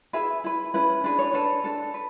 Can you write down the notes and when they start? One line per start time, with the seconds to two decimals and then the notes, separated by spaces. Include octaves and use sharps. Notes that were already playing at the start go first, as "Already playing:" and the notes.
0.13 E4 G#4 B4 E5
0.44 E4 B4
0.74 C#4 E4 B4
1.04 D4 G#4 B4
1.19 C#5
1.34 D4 A4 B4
1.64 D4 A4
1.94 B4